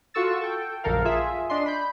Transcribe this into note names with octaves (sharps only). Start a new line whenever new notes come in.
F4 F#4 A4 C#6 E6 A6
A4 G5
A#1 F#2 D3 A4 A#4 F5
F4 G#4 E5
D4 D#5 C6
B5 G6